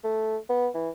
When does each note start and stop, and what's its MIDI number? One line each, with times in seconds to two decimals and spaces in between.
0.04 0.37 57
0.49 0.68 59
0.75 0.90 52